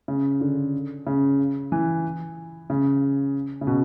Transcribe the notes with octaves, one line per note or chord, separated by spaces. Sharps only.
C#3
D3
C#3
E3
C#3
C#3
B2